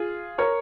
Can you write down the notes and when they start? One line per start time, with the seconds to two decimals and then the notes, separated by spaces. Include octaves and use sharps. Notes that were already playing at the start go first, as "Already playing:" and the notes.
Already playing: F4 G#4
0.38 A#4 C#5